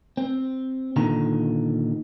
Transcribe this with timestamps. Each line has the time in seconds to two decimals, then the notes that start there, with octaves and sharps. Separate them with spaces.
0.17 C4
0.96 A#2 D3 D#3 A#5